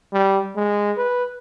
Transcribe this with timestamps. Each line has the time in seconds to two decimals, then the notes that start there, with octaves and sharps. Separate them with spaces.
0.13 G3
0.56 G#3
0.97 B4